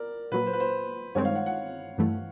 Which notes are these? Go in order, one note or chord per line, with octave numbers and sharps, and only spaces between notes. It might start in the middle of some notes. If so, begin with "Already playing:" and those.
Already playing: A#4 D5
A#2 F#3 A#3 B4
C5
B4
C5
G2 D#3 G#3 C4 C#5
F5
F#5
F#5
G2 E3 A3